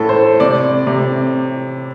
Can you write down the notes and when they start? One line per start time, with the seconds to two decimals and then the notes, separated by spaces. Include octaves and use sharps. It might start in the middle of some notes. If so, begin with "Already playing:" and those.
Already playing: A2 A4
0.09 C5
0.40 C3 D5
0.87 C3